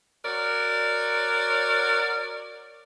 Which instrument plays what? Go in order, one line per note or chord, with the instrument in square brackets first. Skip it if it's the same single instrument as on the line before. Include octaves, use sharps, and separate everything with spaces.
[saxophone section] F#4 A#4 C#5 D5